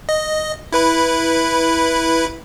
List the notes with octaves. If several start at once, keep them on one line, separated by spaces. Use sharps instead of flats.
D#5
E4 B4 B5